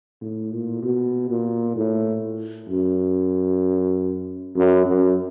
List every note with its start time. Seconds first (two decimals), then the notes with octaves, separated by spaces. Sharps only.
0.22 A2
0.52 A#2
0.83 B2
1.30 A#2
1.76 A2
2.69 F#2
4.55 F#2
4.86 F#2